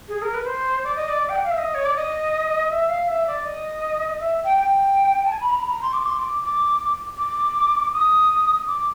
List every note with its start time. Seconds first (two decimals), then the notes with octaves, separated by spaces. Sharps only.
0.08 G#4
0.22 A#4
0.34 B4
0.46 C5
0.83 D5
0.95 D#5
1.08 D5
1.29 G5
1.36 F#5
1.44 F5
1.50 E5
1.58 D#5
1.74 C#5
1.85 D5
1.96 D#5
2.70 E5
2.89 F5
3.08 E5
3.27 D5
3.45 D#5
4.20 E5
4.44 G5
4.57 G5
5.25 A5
5.31 G#5
5.40 B5
5.49 A#5
5.59 B5
5.68 A#5
5.82 C6
5.93 D6
6.06 C6
6.18 D6
6.43 D6
7.17 D6
7.92 D#6
8.67 D6